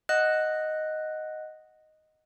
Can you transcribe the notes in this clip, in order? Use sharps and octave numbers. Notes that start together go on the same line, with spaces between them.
D#5 F#5 F#6